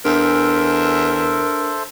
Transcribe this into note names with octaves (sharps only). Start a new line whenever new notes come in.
E2 D4 A4 A#4 C5 E5